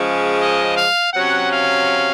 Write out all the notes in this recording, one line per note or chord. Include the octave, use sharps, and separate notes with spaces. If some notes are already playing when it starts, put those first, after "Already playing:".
Already playing: C#3 F3 G#3 C#4
D#5
F5
C3 F#3 C#4 F#5
F5